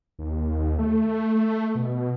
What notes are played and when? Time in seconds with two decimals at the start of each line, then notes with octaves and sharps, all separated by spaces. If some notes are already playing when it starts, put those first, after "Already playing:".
0.19 D#2
0.79 A3
1.35 A3
1.75 B2